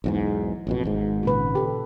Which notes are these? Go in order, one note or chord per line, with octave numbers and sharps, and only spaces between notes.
B1 E2 G#2
A1 F2 B2
G#1 G#2
A#2 C#3 B4
G4 A4